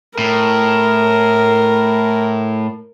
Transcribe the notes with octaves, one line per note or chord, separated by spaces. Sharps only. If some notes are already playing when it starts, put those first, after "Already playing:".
A2 A#4